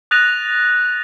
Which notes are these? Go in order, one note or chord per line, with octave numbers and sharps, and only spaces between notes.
D#6 F#6 A6 A#6 D#7 F7